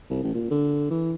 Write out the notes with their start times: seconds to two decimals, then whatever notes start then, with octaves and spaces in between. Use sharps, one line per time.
0.10 C2
0.23 A1
0.35 A#2
0.51 D3
0.91 E3